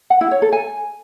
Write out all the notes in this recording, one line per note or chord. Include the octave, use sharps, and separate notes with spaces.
F#5
E4
C#5
A4
G#5